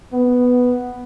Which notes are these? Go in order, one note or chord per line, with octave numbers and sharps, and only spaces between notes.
B3